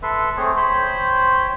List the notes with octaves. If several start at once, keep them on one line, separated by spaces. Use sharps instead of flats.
A4 B4 E5 C6
A3 C4 G#4 C#5
C5 C#5 G5 B5